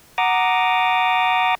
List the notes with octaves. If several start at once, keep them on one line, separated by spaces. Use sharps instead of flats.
F#5 A#5 D6 D#6